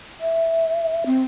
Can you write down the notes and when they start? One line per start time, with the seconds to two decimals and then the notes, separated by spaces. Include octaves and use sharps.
0.21 E5
1.06 C4